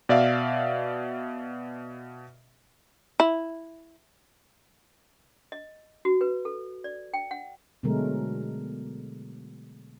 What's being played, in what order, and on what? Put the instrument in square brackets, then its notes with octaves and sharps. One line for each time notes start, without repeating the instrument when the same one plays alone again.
[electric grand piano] B2 D5 E5 F5
[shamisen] E4
[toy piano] D#5
F#4
B4
A4
D5
G5
F#5
[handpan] B2 D3 F#3 G#3 A3 A#4